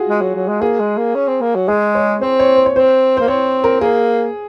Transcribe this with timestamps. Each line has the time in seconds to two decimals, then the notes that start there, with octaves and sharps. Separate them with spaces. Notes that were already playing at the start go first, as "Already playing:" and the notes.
Already playing: F4 F#4 G#4
0.08 G#3
0.21 F#3
0.35 F#3
0.48 G#3
0.61 A#3 G#4
0.80 G#3
0.97 A#3
1.15 C#4
1.28 C4
1.41 A#3
1.55 F#3
1.68 G#3 G#4
1.95 C#5
2.21 C4 C5
2.40 C#5
2.56 C5
2.66 C#5
2.75 C4 C5
3.17 A#3 C5
3.28 C4 C#5
3.64 A#4
3.81 A#3 G#4